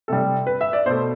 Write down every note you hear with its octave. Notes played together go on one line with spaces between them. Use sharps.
C3 G3 A4
B4
E5
D5
B2 A3 C5